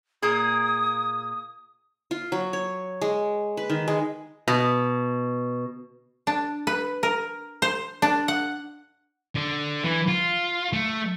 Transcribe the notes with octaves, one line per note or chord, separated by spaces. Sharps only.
A#2 A#3 G#4 D#6
F4
F#3
C#5
G#3
B4
D#3
G#3
B2
D4
B4
A#4
C5
D4
F#5
D3
E3
F4
A3